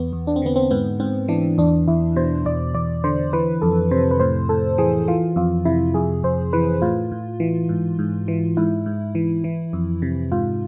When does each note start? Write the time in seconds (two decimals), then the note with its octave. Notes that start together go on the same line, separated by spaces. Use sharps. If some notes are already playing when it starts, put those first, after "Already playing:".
Already playing: E2 B3
0.13 E2
0.27 D4
0.36 C4
0.42 D3 B3
0.56 C4
0.71 G#2 B3
1.00 G#2 C4
1.28 E3 D4
1.58 E2 D4
1.88 E2 E4
2.16 B2 C5
2.45 E2 D5
2.74 E2 D5
3.04 D3 C5
3.33 E3 B4
3.62 F2 A4
3.91 C3 C5
4.11 B4
4.20 A2 C5
4.49 A2 A4
4.78 E3 G#4
5.08 E3 F4
5.36 F2 F4
5.65 C3 E4
5.94 F2 G#4
6.23 F2 C5
6.53 E3 B4
6.82 A2 F4
7.12 A2
7.40 E3
7.69 G#2
7.99 G#2
8.28 E3
8.57 G#2 E4
8.86 G#2
9.15 E3
9.44 E3
9.73 F2
10.02 C3
10.32 G#2 F4